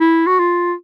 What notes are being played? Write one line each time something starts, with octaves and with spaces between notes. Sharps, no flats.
E4
F#4
F4